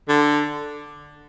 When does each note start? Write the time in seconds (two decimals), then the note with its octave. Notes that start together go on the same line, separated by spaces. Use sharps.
0.08 D3